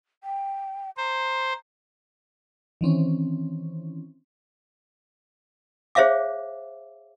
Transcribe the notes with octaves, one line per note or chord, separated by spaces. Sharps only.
G5
C5 A#5
D#3 E3 C4 C#4
G#4 C5 C#5 E5 F5 D6